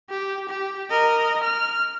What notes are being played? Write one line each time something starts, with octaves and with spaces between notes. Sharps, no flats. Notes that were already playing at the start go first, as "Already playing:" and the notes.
G4
G4
A#4 D#5
F6